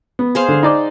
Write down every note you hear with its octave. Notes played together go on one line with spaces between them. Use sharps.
B3
G#4 C5 F5
D3
D#4 D5 D6